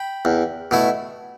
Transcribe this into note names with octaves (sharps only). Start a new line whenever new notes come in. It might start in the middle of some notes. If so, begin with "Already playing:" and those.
Already playing: G5 B5
E2
B2 A3 E4